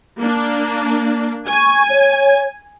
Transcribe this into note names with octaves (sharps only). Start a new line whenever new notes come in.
A#3 D4
G#5 C#6
C#5